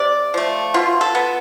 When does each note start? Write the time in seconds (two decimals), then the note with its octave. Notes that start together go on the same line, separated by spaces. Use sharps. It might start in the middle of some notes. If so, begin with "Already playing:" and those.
Already playing: C3 D5
0.34 F3 A3
0.74 B2 F4
1.01 A4
1.15 B3